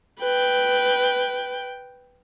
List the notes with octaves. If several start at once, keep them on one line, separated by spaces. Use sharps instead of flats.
B4 G5